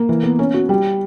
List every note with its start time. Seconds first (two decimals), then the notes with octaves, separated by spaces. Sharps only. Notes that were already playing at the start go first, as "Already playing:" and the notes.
Already playing: A#3
0.09 E3
0.23 B3
0.39 C#4
0.54 F#4
0.69 G3